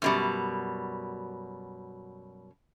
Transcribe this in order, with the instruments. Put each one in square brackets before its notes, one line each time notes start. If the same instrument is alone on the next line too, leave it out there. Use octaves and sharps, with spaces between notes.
[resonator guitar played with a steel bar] F#2 B2 G3